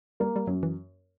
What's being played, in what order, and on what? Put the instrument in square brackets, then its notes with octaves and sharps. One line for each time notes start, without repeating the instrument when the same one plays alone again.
[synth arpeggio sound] G3 [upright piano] A#3
[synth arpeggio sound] G3
[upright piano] F#2 [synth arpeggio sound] F#3
[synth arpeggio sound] E3